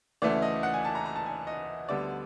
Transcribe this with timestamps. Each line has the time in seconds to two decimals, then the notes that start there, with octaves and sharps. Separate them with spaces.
0.22 D2 C#3 E3 A3 D5
0.42 D#5
0.63 F#5
0.74 G#5
0.85 A5
0.95 A#5
1.05 A#5
1.16 A5
1.26 G#5
1.47 D#5
1.89 D2 D3 G3 B3 D5